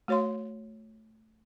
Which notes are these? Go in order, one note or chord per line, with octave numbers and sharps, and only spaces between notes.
A3 F#4 C#5 F5 C6